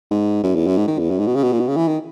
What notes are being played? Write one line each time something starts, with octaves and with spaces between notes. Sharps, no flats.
G#2
F#2
E2
F#2
G#2
D#3
E2
F#2
G#2
B2
C#3
B2
A#2
B2
C#3
E3
D#3